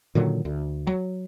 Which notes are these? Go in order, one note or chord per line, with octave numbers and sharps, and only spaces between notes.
A#2 D3 D#3 F#3
D2
F#3